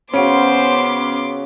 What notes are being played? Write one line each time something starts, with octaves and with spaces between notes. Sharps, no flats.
C#3 B3 C#4 F#4 C5 C6 D6 D7